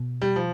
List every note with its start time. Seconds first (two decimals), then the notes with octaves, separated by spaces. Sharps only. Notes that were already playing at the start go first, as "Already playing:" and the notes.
Already playing: B2
0.22 G3
0.36 F3